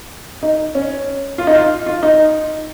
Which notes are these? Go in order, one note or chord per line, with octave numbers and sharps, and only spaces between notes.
D#4
C#4
F4
D#4
F4
F4
D#4